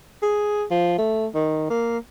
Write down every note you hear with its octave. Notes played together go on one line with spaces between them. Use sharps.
G#4
F3
A3
D#3
A#3